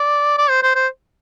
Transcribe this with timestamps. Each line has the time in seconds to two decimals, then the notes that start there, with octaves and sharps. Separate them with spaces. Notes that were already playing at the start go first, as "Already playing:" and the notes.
Already playing: D5
0.38 D5
0.50 C5
0.63 C5
0.75 C5